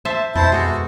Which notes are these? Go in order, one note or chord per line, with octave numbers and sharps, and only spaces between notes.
C5 E5 A5
F2 B2 E4 C5 A5
G#3 F#4 A4